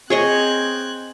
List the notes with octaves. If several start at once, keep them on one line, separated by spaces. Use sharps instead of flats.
C4 G#4 C#5 D#5 F#6 G#6